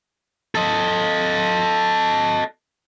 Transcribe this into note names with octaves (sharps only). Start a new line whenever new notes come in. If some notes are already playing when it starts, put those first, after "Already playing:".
A4 D#5